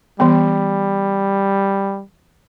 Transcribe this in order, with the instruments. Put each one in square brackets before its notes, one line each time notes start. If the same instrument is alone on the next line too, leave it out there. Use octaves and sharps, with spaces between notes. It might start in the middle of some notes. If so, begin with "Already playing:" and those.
[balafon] E3 B3 [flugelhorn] G3